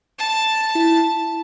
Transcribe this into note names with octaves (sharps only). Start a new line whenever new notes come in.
A5
E4